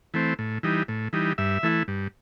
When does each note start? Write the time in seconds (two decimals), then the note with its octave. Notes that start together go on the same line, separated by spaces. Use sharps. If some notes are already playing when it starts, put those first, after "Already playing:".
0.14 E3 A3 C4
0.39 A2
0.63 E3 G3 D#4
0.88 A2
1.13 E3 G3 D#4
1.38 G2 E5
1.63 E3 A3 E4
1.88 G2